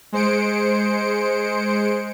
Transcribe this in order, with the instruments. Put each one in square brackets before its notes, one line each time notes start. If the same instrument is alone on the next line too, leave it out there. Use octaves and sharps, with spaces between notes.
[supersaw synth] G#3 C5 C#7 D7